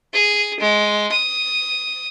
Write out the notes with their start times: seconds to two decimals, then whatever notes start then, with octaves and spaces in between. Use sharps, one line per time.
0.13 G#4
0.60 G#3
1.11 D#6